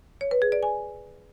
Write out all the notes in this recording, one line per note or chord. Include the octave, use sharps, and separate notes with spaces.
C#5
B4
G#4
D5
G#5